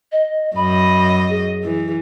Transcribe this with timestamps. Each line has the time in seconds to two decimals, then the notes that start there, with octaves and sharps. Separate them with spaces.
0.12 D#5
0.56 F#2 D#5 B5
1.29 G#4
1.63 E3